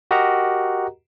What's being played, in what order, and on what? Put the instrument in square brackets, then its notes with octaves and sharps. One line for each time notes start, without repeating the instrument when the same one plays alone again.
[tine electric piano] F#4 G4 A#4 D#5 F#5 A#5